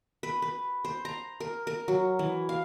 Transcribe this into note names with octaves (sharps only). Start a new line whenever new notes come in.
B4
B4
C5
A#5
A#4
A#4
F#3
E3
F5